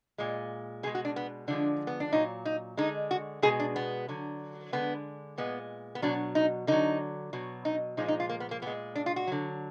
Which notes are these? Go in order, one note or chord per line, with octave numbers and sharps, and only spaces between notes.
A#2 G#3
B2 G#3 G#4
F#4
D4
B3
D3 F3 G#3 D4
B3
D4
A#2 F#3 D#4
D#4
D3 G#3 D#4
F#4
B2 G#3 G#4
D4
B3
D3 F#3
D3 G#3 B3
A#2 G#3 B3
B3
B2 F#3 D4
D#4
D3 F#3 D#4
B2 F#3
D#4
A#2 F3 G#3 D#4
D#4
F4
A#3
B3
A#3
A#2 G#3 B3
D4
F4
F#4
D3 F#3